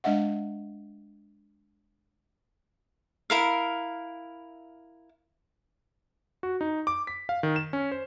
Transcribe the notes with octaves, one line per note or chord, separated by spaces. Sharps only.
G#3 D4 D#5 E5 F#5
E4 A#4 F5
F#4
D#4
D6
B6
F5
D#3
E7
C#4
C5